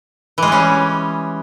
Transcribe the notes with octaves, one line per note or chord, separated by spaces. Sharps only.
E3 G3 G#3 C#4